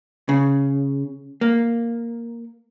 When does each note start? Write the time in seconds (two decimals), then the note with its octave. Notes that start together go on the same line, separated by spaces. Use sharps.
0.29 C#3
1.41 A#3